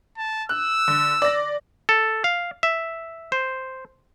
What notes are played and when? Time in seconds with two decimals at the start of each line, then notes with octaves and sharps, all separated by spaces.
0.17 A5
0.49 E6 F#6
0.88 D3
1.22 D5 A#6
1.89 A4
2.24 F5
2.63 E5
3.32 C5